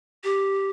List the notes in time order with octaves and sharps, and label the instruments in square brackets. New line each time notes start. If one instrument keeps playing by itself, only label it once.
[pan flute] G4